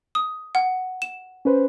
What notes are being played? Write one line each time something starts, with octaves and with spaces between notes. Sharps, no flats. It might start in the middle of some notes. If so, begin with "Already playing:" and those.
D#6
F#5
E7
C#4 B4 C5